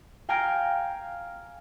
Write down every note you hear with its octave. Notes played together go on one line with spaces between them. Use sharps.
F5 G5 G#5 A#5 F6 D7